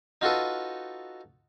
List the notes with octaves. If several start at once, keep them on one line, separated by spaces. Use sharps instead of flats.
D#4 F4 F#4 A4 B4